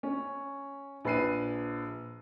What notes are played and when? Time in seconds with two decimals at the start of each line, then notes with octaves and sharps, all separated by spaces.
0.03 C#4
1.05 A#1 B4 C7 D#7